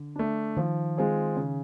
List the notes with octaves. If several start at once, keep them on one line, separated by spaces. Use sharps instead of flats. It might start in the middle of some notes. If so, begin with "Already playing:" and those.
Already playing: D3
A3 D4
D#3 F3
G#3 C4 F4 G#4
C#3